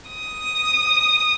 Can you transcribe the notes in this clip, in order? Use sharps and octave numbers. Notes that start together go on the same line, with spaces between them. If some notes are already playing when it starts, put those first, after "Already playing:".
D#6